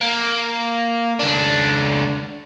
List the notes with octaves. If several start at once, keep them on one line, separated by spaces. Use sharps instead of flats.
A#3
C#2 D4